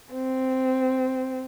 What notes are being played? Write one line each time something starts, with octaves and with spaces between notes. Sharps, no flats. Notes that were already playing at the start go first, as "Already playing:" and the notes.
C4